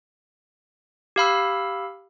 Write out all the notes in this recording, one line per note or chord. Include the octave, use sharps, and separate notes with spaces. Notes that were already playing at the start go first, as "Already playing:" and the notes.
G4 F5 B5 E6